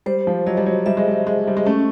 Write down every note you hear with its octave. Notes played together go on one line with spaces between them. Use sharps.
G3 C5
F3
F#3 D#5
G3
F#3
G3 E5
G#3
G3
G#3 E5
G3
G#3
A3 C#4